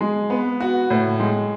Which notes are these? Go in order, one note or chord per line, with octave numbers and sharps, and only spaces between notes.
G#3
B3
F#4
A2
G#3